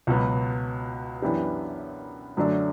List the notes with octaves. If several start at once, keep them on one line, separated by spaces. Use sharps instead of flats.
C#2 B2 F#3 B3
F#2 E3 B3 D4 G4
F#2 D3 F#3 A3 D4